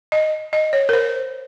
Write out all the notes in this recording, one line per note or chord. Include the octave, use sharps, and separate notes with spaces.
D#5
D#5
C#5
A#4
C5